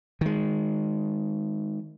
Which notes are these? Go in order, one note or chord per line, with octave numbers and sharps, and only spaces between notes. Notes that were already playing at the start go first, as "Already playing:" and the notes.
D#3 G#3